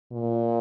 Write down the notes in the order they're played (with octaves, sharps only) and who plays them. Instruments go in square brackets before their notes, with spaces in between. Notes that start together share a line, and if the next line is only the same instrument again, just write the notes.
[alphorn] A#2